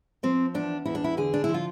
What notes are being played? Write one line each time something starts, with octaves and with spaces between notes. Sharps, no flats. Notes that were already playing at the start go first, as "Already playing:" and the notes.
F3 C4
E2 D4
E2 E4
D4
E4
D3 G#4
D4
F3 E4
F4